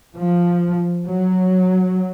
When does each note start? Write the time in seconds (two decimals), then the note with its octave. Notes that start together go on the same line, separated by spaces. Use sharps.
0.16 F3
1.07 F#3